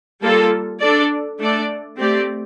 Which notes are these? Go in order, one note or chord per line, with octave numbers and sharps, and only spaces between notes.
G3 A#3 F4 A4
D4 A4 D5
A3 D4 A4 D5
A3 C4 G4 D5